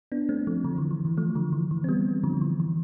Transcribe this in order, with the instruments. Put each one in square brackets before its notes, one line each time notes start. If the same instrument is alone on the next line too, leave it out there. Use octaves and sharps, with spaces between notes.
[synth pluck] B3 D4
A3 C4
F3 A3
D3 F3
E3
E3
E3
F3 A3
D3 F3
E3
E3
C4
G3 B3
D3 F3
E3
E3